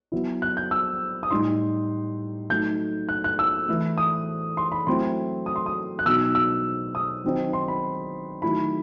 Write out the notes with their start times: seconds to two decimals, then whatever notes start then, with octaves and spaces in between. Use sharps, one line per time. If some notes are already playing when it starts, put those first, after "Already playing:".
0.12 F#3 B3 E4
0.42 F#6
0.57 G6
0.71 E6
1.23 D#6
1.31 A2 G3 D#4 C6
2.50 F#3 A3 D#4 G6
3.09 F#6
3.24 F#6
3.39 E6
3.68 E3 A3 E4
3.98 D#6
4.57 C6
4.72 B5
4.87 F#3 A3 C4 E4 C6
5.46 D#6
5.56 C6
5.66 D#6
5.99 F#6
6.06 B2 F#3 B3 D#4 E6
6.35 E6
6.95 D#6
7.24 D#3 F#3 C4 D#4
7.53 C6
7.68 B5
8.42 D#3 F#3 A3 E4 B5